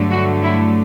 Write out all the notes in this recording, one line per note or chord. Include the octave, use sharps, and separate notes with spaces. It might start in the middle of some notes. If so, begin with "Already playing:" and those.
Already playing: G2 D3 F#3 A3
F#4
E4